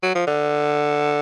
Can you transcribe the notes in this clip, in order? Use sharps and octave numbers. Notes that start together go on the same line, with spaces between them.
F#3
F3
D3